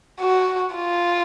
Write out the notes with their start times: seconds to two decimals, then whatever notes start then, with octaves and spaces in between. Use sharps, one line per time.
0.20 F#4
0.76 F4